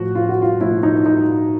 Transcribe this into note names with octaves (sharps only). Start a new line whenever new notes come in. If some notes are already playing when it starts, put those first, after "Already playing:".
Already playing: A2 F3 F#4
F4
F#4
F4
A2 F3 E4
D#4
D#4